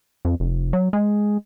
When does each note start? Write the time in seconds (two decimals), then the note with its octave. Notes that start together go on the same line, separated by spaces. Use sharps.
0.25 F2
0.40 F1
0.73 F#3
0.93 G#3